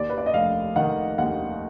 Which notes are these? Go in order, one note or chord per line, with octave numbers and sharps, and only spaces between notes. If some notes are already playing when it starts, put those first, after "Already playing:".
Already playing: D#2 D5
B4
D5
D#5
F1 F5
D#3 F#5
D#2 F#5